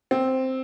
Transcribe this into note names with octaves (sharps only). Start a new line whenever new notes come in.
C4